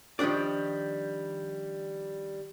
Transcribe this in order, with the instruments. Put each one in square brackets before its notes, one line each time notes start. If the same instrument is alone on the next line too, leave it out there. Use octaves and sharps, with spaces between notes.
[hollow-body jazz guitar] D#3 F3 G3 D4 D5